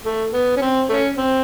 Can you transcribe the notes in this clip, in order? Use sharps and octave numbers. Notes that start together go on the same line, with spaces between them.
A3
B3
C#4
C4
A3 C#4
C4